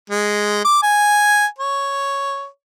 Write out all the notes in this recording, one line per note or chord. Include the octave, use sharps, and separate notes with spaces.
G#3
D6
G#5
C#5